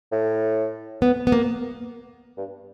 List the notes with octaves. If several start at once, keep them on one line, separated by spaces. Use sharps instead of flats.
A2
B3
B3
A#3
G2